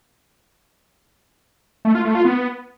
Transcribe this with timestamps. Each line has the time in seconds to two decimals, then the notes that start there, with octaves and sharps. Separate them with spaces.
1.85 A3
1.95 F4
2.05 A3
2.15 F4
2.25 B3